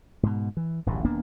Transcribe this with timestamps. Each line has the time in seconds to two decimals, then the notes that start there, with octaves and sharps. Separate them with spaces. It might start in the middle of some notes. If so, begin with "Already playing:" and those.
0.23 G#2 B2
0.57 E3
0.86 D1 A1 D2 G2
1.05 D#1 A#3 B3 D4